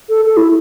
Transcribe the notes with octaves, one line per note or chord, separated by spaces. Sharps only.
A4
A4
E4